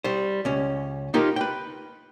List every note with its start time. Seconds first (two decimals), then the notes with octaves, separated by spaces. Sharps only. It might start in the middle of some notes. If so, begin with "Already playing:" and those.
0.04 G3 C5
0.45 C#2 C#4
1.14 A#3 D#4 F4 G4 A#4
1.36 B4 G5